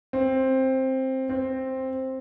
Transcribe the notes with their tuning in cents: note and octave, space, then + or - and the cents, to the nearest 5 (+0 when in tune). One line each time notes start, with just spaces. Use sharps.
C4 +10
C4 +5